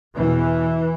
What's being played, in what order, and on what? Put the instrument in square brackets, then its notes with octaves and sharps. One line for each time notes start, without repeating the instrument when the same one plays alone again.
[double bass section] E2 B2 E3